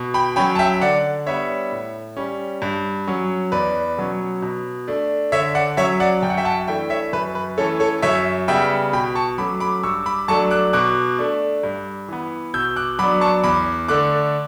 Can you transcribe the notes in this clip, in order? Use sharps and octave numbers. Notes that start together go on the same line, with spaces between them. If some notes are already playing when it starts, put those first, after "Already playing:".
Already playing: B2
G5 B5
F#3 C#4 G5 B5
A5
E5 G5
D3 D5 F#5
G3 B3 D4 C#5 E5
A2
G3 C#4
G2
F#3 C#4
E2 B4 D5
B2 F#3 C#4
B2
A3 D4
D3 C#5 E5
D5 F#5
F#3 C#4 C#5 E5
D5 F#5
F#2 G5
F#5
E5 G5
F#5 A5
E3 A3 D4 E5 G5
C#5 E5
F#2 B4
B4
E3 A3 C#4 A4 C#5
A4 C#5
F#2 C#5 E5
C#3 G3 B3 E5 G5
B2 G5 B5
A5 C#6
F#3 A3 C#4 B5 D6
B5 D6
G2 C#6 E6
B5 D6
F#3 A3 D4 A5 C#6
D6 F#6
B2 D6 F#6
A3 D4
G2
E3 B3
B2 E6 G6
D6 F#6
F#3 B3 D4 B5 D6
A5 C#6
E2 B5 D6
D3 A3 D6 F#6